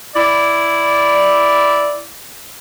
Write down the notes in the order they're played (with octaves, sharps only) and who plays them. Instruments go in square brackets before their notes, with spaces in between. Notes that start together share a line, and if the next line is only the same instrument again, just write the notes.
[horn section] E4 D5